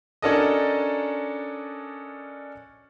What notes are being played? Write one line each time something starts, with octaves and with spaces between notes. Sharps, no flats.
C#4 D4 F#4 A4 A#4 D#5